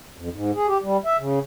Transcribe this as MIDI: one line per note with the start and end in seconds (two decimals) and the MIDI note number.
0.17 0.29 41
0.33 0.51 44
0.55 0.67 68
0.68 0.78 67
0.82 0.97 55
1.05 1.17 76
1.18 1.39 49